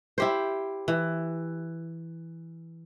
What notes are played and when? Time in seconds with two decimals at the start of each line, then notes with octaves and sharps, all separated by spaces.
0.18 E4 G4 C5
0.88 E3